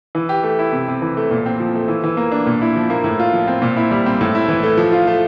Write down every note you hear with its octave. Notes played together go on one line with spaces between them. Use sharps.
E3
G4
A3
E4
C3
C3
E3
A3
A#2
C4
F3
A3
E3
E3
A#3
D4
A#2
E4
F3
A#3
A2
F4
F3
C4
A#2
E4
G3
C4
A2
E4
E3
A3
F3
F4
A3